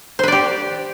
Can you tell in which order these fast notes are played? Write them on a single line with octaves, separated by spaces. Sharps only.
C5 B4 D5 G4